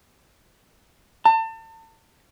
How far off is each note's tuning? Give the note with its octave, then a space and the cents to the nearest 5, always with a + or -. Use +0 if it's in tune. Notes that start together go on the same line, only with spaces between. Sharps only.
A5 +35